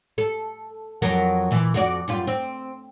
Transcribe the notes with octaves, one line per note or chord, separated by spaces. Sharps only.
A4
F2 F#3 A#4
A#2 E3
F2 F#4 D5
F#2 G3 F4
C4